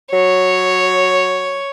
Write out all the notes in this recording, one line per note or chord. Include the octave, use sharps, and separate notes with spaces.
F#3 C#5